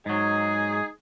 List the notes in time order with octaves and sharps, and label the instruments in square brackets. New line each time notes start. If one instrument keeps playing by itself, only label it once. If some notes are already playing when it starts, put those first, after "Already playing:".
[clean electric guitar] G#2 F#3 [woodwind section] D#4 G#4